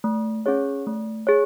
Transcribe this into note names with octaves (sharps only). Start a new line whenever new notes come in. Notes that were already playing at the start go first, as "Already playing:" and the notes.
A3
C#4 G#4 C#5
A3
G#4 C#5